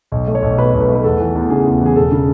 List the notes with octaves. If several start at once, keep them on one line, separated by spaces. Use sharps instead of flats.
B1
A3
C#5
B1
B2 B4
B1
B4
A3
B4
E2 A4
E3
E2
C#3 G#4
E2
E3 G#4
E1 A4
C#3